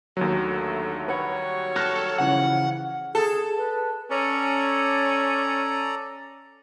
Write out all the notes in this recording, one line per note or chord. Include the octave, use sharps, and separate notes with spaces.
D#2 D3 F#3 A3
G3 F#4 B4 C#5 F#5
A4 F6 F#6 A#6
C#3 E3 F3 F#5
G#4 A4
B4
C#4 A4 D5 A#5